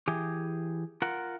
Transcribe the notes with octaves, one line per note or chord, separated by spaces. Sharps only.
E3 G4 G#4
F4 A#4 F#5